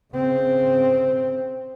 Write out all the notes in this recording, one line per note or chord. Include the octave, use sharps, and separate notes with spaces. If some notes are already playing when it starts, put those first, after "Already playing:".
C#3 C4